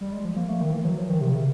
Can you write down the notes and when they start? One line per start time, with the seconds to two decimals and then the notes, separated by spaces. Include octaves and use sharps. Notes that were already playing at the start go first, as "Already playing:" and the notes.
0.01 G3
0.13 G#3
0.25 F3
0.36 A#3
0.49 A3
0.61 D#3
0.73 E3
0.85 F#3
0.98 F3
1.09 D#3
1.21 C3
1.33 C#3